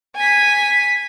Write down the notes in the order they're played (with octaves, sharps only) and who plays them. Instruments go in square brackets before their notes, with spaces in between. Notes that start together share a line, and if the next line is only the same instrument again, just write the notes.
[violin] G#5 B6